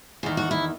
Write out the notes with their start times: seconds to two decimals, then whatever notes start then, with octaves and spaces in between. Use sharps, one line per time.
0.23 E2 D#3
0.37 F#4
0.51 E4